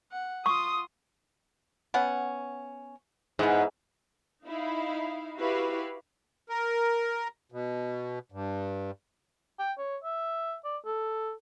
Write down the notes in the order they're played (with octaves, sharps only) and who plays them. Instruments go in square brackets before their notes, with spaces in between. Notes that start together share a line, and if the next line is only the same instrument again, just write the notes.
[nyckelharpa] F#5
[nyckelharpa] F4 C6 [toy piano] C#6 [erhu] D#6
[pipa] B3 C#4 F#5
[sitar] G#2 [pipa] E3 B3
[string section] D#4 E4 F5
E4 F#4 G4 B4 F5
[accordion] A#4
B2
G2
[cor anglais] G5
C#5
E5
D5
A4